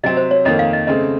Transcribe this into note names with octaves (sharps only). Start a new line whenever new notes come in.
C3 F#3 C4 D#5
C5
C#5
F2 D#3 A#3 D#5
F5
D#5
C#3 A3 C4 D#5